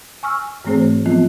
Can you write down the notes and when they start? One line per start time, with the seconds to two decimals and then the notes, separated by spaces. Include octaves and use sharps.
0.23 G#5 C#6 E6 F6
0.65 G#2 E3 A3 C4 G#4 C5
1.06 F3 F#3 B3 C4 F4